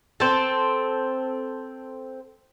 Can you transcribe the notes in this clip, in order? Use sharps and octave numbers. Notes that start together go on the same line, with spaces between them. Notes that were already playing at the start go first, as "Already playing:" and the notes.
C4 A4